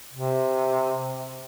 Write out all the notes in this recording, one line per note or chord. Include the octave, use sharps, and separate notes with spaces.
C3